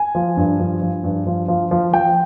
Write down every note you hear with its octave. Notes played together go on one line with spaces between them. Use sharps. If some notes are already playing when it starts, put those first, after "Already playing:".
Already playing: G#5
F3
G2
F3
F3
G2
F3
F3
F3
F3 G5